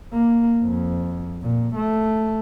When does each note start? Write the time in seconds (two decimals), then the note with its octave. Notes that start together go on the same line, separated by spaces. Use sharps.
0.13 A#3
0.63 F2
1.42 A#2
1.75 A3